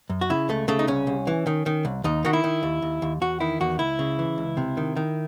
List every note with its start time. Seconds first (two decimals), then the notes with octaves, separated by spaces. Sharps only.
0.10 F#2
0.21 F#4
0.30 C#3 E4
0.49 C#2 A3
0.68 C#3 A3
0.79 D#4
0.88 C2 C#4
1.07 C2
1.27 E3
1.47 D#3
1.66 D#3
1.85 C2
2.04 D#2 D#4
2.25 D#3 F#4
2.33 E4
2.44 D#3
2.63 D#2
2.82 D#2
3.02 D#2
3.21 E2 F#4
3.40 D#3 E4
3.60 E2 F#4
3.79 C#2 E4
3.99 C#3
4.19 E3
4.38 C#2
4.57 C3
4.77 D#3
4.96 D#3